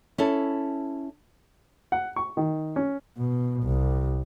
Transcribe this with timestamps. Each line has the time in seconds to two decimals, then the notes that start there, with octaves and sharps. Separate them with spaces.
0.18 C#4 E4 A4
1.92 F#5
2.16 C#6
2.37 D#3
2.76 C#4
3.17 B2
3.63 C2